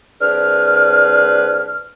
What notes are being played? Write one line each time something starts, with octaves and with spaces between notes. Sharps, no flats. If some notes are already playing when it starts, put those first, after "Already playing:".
C2 D4 G#4 B4 C5 F6